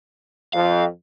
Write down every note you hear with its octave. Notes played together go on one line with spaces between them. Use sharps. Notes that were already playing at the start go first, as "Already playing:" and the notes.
F2 F5